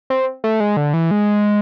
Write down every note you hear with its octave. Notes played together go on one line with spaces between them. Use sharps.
C4
A3
G#3
D3
E3
G#3